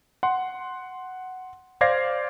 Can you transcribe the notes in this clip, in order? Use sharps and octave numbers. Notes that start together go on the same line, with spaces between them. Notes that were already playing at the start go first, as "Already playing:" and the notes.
F#5 C6
C5 D5 F5 G#6 A#6 C7